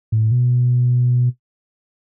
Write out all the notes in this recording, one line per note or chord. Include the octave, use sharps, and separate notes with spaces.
A2
B2